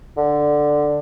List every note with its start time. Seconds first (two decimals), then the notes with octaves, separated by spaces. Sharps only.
0.17 D3